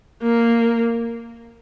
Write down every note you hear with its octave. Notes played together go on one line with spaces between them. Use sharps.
A#3